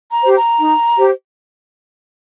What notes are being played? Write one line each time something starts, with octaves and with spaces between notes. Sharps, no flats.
A#5
G4 C5
A#5
D#4
G4 C5